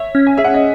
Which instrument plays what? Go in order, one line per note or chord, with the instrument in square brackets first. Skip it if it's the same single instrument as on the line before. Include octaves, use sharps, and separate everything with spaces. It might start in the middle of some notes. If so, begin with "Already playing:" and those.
Already playing: [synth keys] C#5 [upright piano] E5
[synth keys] C#4
[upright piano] G#5
[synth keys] G#4 [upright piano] E5
[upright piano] F#5
D#5